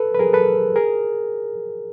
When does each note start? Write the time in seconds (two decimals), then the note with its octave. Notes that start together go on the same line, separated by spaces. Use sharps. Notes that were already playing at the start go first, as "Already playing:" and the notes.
Already playing: A4 B4
0.14 B4
0.19 G#4 A#4
0.33 A4 B4
0.76 G#4 A#4